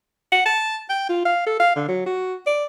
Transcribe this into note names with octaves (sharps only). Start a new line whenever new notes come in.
F#5
A5
G5
F4
F5
A4
F5
D3
F#3
F#4
D5